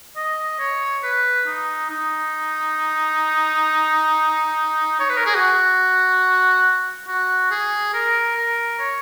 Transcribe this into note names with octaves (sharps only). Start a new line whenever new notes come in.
D#5
C#5
B4
D#4
D#4
C#5
B4
A#4
G#4
F#4
F#4
G#4
A#4
A#4
C#5